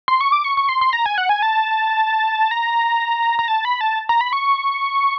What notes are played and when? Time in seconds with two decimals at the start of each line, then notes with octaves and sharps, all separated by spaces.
0.08 C6
0.21 C#6
0.32 D6
0.44 C#6
0.57 C#6
0.69 C6
0.81 C6
0.93 A#5
1.06 G#5
1.18 F#5
1.29 G#5
1.42 A5
2.51 A#5
3.39 A#5
3.48 A5
3.65 B5
3.81 A5
4.09 A#5
4.21 B5
4.33 C#6